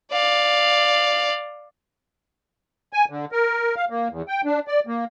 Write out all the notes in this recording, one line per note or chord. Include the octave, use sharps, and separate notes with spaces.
D5 F5
G#5
D3
A#4
F5
A#3
E2
G5
D4
D5
A#3